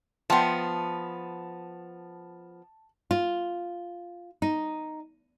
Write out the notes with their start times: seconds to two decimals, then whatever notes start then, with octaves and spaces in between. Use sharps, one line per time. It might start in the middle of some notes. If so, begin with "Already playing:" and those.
0.30 F3 B3 E5 G5 A5 C6
3.11 F4
4.42 D#4